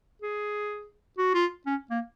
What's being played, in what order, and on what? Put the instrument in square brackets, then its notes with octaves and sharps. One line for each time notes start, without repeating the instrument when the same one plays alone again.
[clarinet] G#4
F#4
F4
C#4
A#3